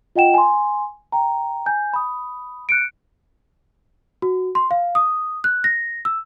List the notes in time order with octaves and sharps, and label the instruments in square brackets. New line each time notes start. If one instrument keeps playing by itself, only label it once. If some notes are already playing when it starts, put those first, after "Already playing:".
[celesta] F4 D#5 F#5 G5 E7
G#5 C6
G5 A#5
G#5 G6
B5 D#6
F#6 C#7 D7
F#4
C6
F5
D#6
F#6
A#6
E6